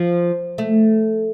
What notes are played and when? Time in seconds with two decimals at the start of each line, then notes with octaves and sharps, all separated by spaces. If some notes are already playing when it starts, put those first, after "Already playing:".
Already playing: F3
0.58 A3